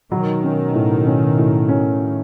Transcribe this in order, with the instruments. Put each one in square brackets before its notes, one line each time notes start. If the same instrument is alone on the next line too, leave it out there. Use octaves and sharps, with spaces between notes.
[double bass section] B2 D#3 [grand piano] F#3
[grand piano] C#4
A2
C#4
A2
C#4